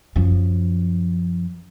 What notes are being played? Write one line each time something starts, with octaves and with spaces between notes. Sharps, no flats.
F#2 F3